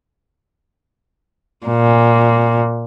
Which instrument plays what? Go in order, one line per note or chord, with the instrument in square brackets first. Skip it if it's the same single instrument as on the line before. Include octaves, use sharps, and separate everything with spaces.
[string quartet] A#2